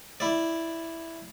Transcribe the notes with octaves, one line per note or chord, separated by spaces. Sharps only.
E4 D5